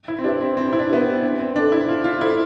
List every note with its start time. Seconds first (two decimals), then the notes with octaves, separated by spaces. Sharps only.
0.08 E4
0.19 C4
0.24 D4 G4 B4 E5
0.41 C4
0.57 C4 D4
0.73 E4
0.79 D4
0.90 B3 G4 B4 E5
1.01 C4
1.23 D4
1.40 C4
1.55 D4 C5
1.59 A4
1.72 E4
1.88 D4 F4
2.04 F4
2.21 E4 A4 C5